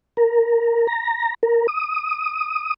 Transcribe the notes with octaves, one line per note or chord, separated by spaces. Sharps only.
A#4
A#5
A#4
D#6